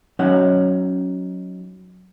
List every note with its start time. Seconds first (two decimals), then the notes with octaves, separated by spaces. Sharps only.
0.19 F#3 C#4 D#4 F#5